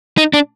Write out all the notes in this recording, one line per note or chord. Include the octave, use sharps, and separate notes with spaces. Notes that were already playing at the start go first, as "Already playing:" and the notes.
D#4
D4